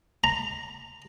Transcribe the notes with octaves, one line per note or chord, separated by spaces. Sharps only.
A#5